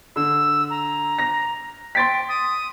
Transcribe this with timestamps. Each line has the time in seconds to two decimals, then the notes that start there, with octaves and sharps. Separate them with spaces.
0.16 D3 E6
0.70 A#5
1.19 A#6
1.95 G5 C6 A6 B6
2.29 D#6